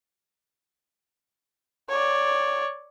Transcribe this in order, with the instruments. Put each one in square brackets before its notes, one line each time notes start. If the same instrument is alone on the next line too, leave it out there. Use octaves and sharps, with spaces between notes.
[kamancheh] C#5 D5